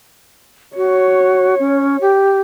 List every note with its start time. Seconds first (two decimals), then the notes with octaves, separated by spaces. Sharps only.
0.76 F#4 C#5
1.60 C#4
2.01 G4